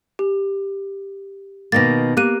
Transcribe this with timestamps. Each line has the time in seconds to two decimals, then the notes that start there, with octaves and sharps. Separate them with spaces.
0.19 G4
1.72 B2 D#3 A#3 A6 A#6
2.17 A#3 G4 F#6 D#7